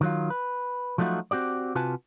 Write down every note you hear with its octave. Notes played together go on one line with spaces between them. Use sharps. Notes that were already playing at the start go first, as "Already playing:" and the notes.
D#3 F#3 F4
B4
F3 F#3 A3 D#4 F4 F#4
C4 F#4 G4 D5
C3 F4 F#4 B4 G#5 A5